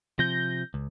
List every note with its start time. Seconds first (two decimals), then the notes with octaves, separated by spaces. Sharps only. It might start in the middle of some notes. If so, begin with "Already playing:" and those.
0.19 C3 F3 G6 A#6
0.74 C#2